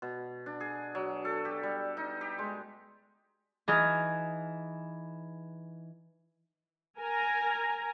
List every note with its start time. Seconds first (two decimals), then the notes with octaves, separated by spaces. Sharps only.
0.02 B2
0.46 D4
0.60 G#4
0.95 F#3
1.25 A4
1.45 G4
1.63 G3
1.97 D#4
2.21 G4
2.39 G#3
3.68 E3 D#4 G#4 F6
6.97 A#4 G#5 A#5